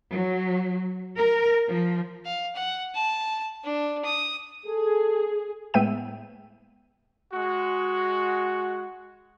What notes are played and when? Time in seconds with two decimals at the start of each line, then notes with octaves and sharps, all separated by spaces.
0.12 F#3
1.17 A#4
1.67 F3
2.25 F5
2.55 F#5
2.94 A5
3.64 D4
4.04 D#6
4.67 G#4 A4
5.74 A2 G#3 B3 E5 G5 D#7
7.33 G#3 F#4